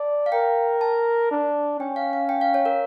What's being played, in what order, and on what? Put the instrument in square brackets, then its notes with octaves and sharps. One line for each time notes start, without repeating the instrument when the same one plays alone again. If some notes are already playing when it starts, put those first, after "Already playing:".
Already playing: [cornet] D5 [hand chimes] A5
[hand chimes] F5
[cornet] A#4 [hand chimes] G5
[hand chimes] A5
[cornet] D4
[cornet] C#4 [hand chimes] G5
[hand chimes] F5
F5
G5
F5
C#5
A#4